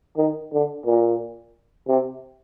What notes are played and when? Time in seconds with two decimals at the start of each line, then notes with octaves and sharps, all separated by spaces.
0.17 D#3
0.52 D3
0.86 A#2
1.88 C3